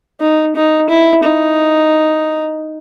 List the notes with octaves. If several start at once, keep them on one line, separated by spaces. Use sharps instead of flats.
D#4
D#4
E4
D#4